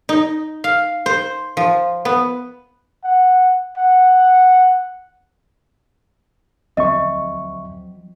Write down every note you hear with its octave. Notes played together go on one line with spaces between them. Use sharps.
D#4
F5
C5
F3
B3
F#5
F#5
D2 F3 F#3 C4 D#5 E5 C#6